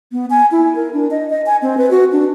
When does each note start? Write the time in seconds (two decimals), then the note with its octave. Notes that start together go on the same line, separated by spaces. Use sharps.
0.12 B3
0.30 G#5
0.52 E4
0.76 A#4
0.93 D4
1.11 D#5
1.30 D#5
1.46 G#5
1.62 C4
1.78 B4
1.91 F#4
2.12 D4